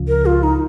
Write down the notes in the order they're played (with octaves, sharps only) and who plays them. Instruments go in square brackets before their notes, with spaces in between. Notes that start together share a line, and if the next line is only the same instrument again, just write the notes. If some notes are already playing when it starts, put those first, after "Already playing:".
Already playing: [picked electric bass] C#2 C#3 F3
[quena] A#4
F4
D#4